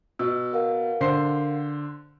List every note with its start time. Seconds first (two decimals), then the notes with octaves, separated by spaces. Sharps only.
0.19 B2 E6
0.53 A#4 F5 F#5
1.01 D3 C5 C7